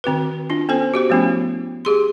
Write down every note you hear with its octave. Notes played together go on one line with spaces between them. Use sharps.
D#3 C4 F#4 B4
D4 F4
B3 C#4 A4 C5 G#5
F#4 G4 C5
F3 A3 B3 C#4 E4
G4 G#4 C6